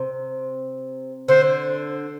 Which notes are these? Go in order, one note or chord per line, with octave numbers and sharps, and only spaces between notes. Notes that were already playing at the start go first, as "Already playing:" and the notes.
Already playing: C3
D3 C5